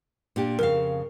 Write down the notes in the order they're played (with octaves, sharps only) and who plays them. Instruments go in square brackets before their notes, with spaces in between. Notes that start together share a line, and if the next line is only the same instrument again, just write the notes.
[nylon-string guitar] A#2 D4 G4
[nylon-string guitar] F2 C#3 F5 [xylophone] A#4